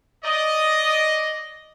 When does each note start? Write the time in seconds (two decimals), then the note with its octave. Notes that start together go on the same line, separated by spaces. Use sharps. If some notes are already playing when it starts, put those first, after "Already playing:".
0.23 D5 D#5